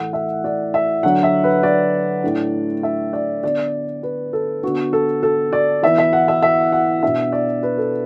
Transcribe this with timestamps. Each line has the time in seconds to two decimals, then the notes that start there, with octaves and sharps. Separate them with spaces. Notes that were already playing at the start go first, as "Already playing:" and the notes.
Already playing: A2 E3 A3 E4 F#5
0.13 E5
0.44 D5
0.74 E5
1.03 D3 F#3 D4 F#5
1.23 E5
1.44 B4
1.63 D5
2.24 A2 A3 D4
2.83 E5
3.13 D5
3.44 D3 B3 D4 D5
4.03 B4
4.33 A4
4.63 D3 B3 D4 F#4
4.93 A4
5.23 A4
5.53 D5
5.83 E3 B3 E4 E5
5.98 E5
6.13 F#5
6.28 E5
6.43 E5
6.72 F#5
7.03 B2 B3 D4 E5
7.32 D5
7.63 B4
7.78 A4